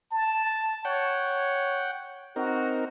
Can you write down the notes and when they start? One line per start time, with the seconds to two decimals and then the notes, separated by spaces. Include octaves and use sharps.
0.12 A5
0.85 C#5 F#5 G5
2.36 C4 D#4 F#4 A#4